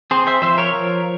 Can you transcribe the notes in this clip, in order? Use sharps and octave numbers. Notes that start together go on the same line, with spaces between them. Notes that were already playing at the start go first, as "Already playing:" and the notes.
C4 G#4 C5
C5 E5
F3 C5 E5
A#4 C#5
F3